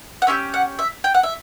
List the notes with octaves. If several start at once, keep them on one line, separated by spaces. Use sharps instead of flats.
F#5
C#4 E4 G4 E5
F#5
E5
G5
F#5
E5